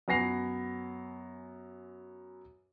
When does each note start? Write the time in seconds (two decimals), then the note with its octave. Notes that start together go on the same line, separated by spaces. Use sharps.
0.08 F#2 B3 G#5 A#6 C7 F7